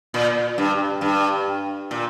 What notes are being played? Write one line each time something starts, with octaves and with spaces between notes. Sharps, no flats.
A#2
G2
G2
A#2